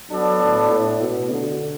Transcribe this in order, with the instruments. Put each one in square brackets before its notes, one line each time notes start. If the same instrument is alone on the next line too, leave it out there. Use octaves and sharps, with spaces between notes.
[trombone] F#3 [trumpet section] B3 D4 A4 D5
[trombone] A2
A2
B2
D3